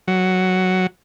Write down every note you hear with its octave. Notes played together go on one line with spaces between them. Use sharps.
F#3